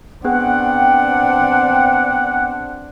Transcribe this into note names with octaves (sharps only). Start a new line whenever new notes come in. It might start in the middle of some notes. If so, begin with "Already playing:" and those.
B3 C4 D4 G#4 B4 F#5 G5